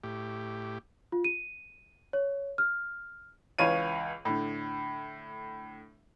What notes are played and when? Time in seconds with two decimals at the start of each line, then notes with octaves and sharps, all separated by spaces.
0.04 A2 G4
1.12 F4
1.24 D#7
2.13 C#5
2.58 F6
3.58 C#2 E3 C#5 F5 D#7
4.25 A2 D3